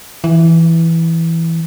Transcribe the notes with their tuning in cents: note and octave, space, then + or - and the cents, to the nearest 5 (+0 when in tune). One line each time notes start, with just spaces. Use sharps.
E3 +0